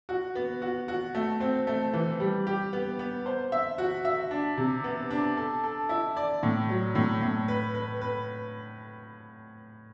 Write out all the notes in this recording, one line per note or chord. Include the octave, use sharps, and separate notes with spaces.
F#4
B3
F#4
F#4
A3
C4
A3
E3
G3
G4
B3
B3
C5
E5
F#4
E5
D4
C3
B3
D4
A4
A4
E4
D5
A2
F#3
A2
A2
B4
B4
B4